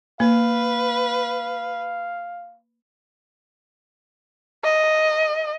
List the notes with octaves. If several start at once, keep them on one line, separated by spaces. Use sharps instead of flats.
A#3 B4 F5
D#5